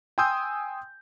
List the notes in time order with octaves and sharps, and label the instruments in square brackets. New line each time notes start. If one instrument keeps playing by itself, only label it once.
[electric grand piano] G5 G#5 C6 D#6 E6 G6